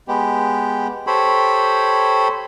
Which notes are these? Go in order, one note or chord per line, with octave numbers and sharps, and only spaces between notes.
G#3 B3 G4
G4 A4 C5 C#5 B5